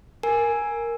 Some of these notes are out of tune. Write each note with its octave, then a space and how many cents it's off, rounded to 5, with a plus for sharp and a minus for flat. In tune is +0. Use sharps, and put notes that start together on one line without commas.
A#4 +0 G#5 +0